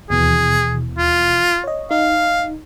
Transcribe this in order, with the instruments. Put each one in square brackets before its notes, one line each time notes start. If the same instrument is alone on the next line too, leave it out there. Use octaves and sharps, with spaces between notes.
[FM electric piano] D#2 B2 E3 [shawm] G#4
[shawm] F4
[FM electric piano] C#5 D#5
[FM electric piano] D#4 [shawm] F5